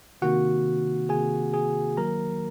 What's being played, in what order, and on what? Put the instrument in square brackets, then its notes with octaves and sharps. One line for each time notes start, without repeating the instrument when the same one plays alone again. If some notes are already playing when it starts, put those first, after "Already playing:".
[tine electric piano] C3 D#3 A#3 F#4 F#5
C3 D#3 A#3 G#4 G#5
G#4 G#5
D#3 F#3 A#3 A#4 A#5